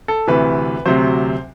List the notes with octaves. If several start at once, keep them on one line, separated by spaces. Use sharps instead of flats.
A4
D2 C3 E3 B4
D2 C3 F#3 C5